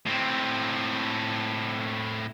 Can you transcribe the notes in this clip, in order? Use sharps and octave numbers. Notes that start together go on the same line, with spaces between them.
A2 C4